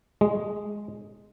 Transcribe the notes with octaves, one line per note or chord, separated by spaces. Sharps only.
G#3